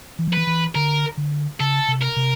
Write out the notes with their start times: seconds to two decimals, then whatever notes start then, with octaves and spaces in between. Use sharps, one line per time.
0.19 E3
0.27 F3
0.33 E3 B4
0.47 E3
0.75 D3 A#4
1.17 D3
1.60 C#3 A4
1.88 C3
2.02 A#4
2.17 C3